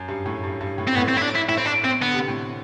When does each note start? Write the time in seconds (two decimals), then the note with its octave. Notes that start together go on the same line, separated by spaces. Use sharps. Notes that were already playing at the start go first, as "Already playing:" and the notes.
Already playing: F#2
0.08 G2
0.26 A2
0.43 G2
0.60 G2
0.78 A2
0.88 C4
0.95 A2 B3
1.09 C4
1.17 E4
1.22 D4
1.36 E4
1.49 A2 E4
1.58 C4
1.66 D4
1.84 C4
2.01 D3 B3
2.14 C3
2.28 A2